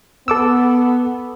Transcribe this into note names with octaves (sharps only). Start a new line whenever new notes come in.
B3 A4 D6 E6